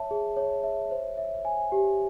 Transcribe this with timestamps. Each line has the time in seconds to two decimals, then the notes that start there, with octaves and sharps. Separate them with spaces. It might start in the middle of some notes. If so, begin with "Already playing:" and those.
Already playing: C#5 E5 A5
0.11 G#4
0.36 C#5
0.64 E5
0.91 C5
1.18 E5
1.45 G#5
1.72 G4